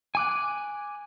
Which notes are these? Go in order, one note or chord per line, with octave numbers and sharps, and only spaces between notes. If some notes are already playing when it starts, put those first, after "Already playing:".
G#5 D6 F#6